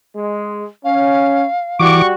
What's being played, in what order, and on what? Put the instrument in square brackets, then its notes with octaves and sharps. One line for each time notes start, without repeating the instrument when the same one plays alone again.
[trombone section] G#3
[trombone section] C#4 [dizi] F5
[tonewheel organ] E3 D6 [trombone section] G3 F#4 [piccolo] C#6